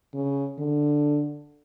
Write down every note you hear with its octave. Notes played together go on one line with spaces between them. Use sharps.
C#3
D3